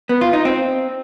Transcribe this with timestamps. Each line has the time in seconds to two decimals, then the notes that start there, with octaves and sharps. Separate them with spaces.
0.09 B3
0.21 F4
0.33 D#4
0.45 C4